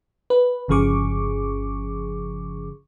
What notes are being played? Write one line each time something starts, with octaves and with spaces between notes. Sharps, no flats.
B4
G1 C#3 F3 G#4 C#6 D6